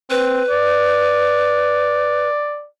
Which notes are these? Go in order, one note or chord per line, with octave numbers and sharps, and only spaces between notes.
C4 B4
D5